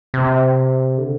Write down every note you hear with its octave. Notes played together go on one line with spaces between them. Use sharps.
C3
D3